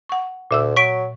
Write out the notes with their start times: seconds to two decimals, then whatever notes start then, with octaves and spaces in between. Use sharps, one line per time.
0.09 F#5 C#6
0.51 D2 A#2 E5 E6
0.76 F#3 C#6 B6 D7